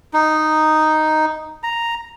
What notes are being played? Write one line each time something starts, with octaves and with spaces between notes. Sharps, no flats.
D#4
A#5